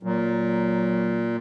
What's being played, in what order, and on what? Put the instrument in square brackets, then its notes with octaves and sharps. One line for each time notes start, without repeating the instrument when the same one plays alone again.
[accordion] A#2 [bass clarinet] F#3